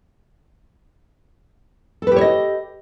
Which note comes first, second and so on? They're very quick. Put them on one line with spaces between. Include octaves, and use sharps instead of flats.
A4 B4 G4 C#5 D#5